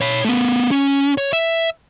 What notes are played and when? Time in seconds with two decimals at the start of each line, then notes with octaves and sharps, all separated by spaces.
0.01 C#5 B5
0.24 A3 B3
0.71 C#4
1.18 C#5
1.33 E5